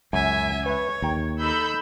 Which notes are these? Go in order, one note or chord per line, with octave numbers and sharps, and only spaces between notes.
C#2 F#2 E5 G#5
B4 C#5 E5
D#2 G5 A#5
D#4 A4 B5 E6 G6